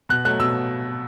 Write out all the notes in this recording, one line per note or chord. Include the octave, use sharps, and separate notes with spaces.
B2 F#6
F#3 A3 F#6
B2 E6